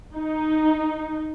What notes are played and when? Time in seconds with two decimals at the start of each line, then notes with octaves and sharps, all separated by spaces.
0.15 D#4